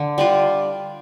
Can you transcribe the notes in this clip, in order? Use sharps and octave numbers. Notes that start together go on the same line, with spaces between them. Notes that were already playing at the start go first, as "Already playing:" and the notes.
Already playing: D3
G3 D4 F4